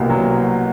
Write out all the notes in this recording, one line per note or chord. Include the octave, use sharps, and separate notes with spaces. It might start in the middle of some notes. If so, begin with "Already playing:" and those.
Already playing: C2 B2 A#3
F#3